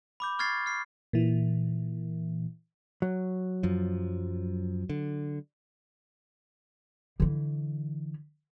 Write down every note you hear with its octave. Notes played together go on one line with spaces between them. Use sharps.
B5 D6 G6
C#6 F6 G#6 A6 C7
F6 C7
A#2 E3
F#3
F#2 F3
D3
D3 E3